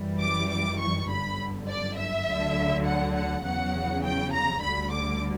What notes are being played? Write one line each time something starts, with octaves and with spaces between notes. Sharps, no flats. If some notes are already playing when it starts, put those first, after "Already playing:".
Already playing: F#2 E3 G3
D6
D6
C#6
G1 F#2 D3 B5
D5
E5
D2 D3 F#3
F#5
F#5
E2 C#3 F#3 F#5
G5
A#5
D2 D3 G3 B5
D6